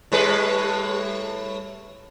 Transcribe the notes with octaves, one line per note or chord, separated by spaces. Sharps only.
A2 G3 B4